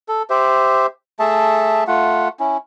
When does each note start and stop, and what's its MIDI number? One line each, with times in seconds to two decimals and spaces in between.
0.08 0.23 69
0.30 0.87 67
0.30 0.87 72
0.30 0.87 76
1.19 1.84 57
1.19 1.84 68
1.19 1.84 76
1.19 1.84 81
1.87 2.28 57
1.87 2.28 65
1.87 2.28 78
2.40 2.57 61
2.40 2.57 64